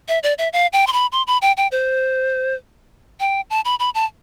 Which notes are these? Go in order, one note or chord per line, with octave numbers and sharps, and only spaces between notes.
E5
D5
E5
F5
G5
C6
B5
C6
B5
G5
G5
C5
G5
A5
B5
B5
A5